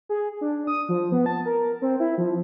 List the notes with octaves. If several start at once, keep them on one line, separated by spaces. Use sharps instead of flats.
G#4
D4
D#6
F3
B3
A5
A#4
C4
E4
F3